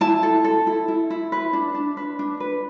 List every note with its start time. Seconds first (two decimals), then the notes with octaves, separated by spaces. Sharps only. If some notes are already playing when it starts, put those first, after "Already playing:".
0.01 E4 A5
0.23 A4
0.44 A4
0.67 E4
0.88 E4
1.10 E4
1.32 B4
1.53 D4
1.74 D4
1.97 B4
2.19 D4
2.40 B4